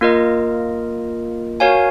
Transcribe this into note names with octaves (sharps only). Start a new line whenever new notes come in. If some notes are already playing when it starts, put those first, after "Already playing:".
A#3 F4 A#4 D#5
F#4 A#4 C#5 F5 G#5